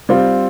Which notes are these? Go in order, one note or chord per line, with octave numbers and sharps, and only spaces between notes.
G3 C4 F4